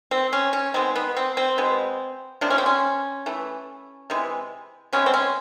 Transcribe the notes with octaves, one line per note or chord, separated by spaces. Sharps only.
C4
C#4
C#4
D#3 G#3 B3 C4
B3
C4
C4
B2 G#3 B3
C3 F3 A#3 D4
C#4
C4
C#4
E3 A3
C3 E3 G#3
C3 F3 G#3 B3 C#4
C4
C#4